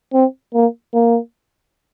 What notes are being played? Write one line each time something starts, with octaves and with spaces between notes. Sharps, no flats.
C4
A#3
A#3